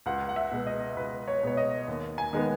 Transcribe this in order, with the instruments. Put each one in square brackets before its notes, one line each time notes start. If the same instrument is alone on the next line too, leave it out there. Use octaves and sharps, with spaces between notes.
[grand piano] C#2 F#5
F#5
E5
B2 G#3 B3
D#5
C#2 B4
C#5
B2 G#3 B3 C#5
D#5
D#2
G#5
D#3 G#3 B3